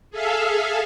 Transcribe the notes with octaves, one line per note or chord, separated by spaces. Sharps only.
G#4 A4 E5 F5